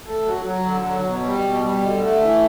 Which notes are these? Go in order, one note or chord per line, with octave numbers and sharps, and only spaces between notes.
A3
F#3
F#3
D3
F#3
B2
G3
B2
G3
D3
A3
E3